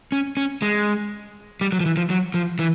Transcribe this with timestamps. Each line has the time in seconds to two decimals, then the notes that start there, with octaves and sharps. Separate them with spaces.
0.12 C#4
0.37 C#4
0.62 G#3
1.61 G3
1.72 F#3
1.80 F3
1.86 E3
1.97 F3
2.10 F#3
2.34 F3
2.59 E3